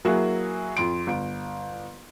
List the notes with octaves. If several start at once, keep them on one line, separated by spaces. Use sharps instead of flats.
F#3 A#3 E4 F#4 G#4
F2 C6 D7
G1 D7